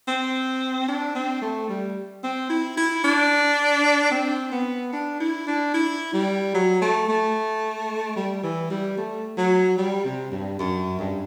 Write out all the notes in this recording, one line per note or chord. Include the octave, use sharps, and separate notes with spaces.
C4
D4
C4
A3
G3
C4
E4
E4
D4
C4
B3
D4
E4
D4
E4
G3
F#3
A3
A3
G3
E3
G3
A3
F#3
G3
C3
G2
F#2
G2